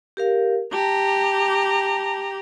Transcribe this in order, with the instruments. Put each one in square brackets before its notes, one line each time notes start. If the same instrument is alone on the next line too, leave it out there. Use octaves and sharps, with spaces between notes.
[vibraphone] G4 A#4 F5
[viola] G4 A#5 [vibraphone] A5